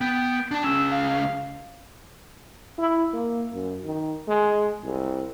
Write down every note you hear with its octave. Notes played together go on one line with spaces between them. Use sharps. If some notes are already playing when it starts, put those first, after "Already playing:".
B3 G5
D4 A5
C#2 C#4 E6
F5
E4
A#3
F#2
D#3
G#3
C2